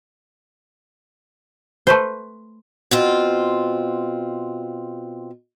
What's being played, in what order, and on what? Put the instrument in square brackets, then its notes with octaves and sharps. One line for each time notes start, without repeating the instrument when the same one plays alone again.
[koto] A3 B4 C5
[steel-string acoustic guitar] B2 C4 F4